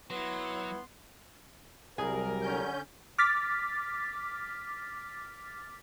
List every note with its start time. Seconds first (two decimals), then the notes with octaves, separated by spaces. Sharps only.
0.10 F#3 B3 E4 C6
1.98 C2 F#3 G3 G#4 A#4
2.42 D3 C#4 G6
3.18 D6 F6 A6 B6